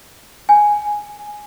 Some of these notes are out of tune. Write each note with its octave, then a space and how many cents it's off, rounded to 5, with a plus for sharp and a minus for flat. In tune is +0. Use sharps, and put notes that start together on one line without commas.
G#5 +0